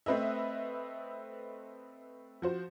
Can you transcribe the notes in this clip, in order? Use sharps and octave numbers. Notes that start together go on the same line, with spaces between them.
A3 C4 B4 D#5 E5
F3 F#4 C5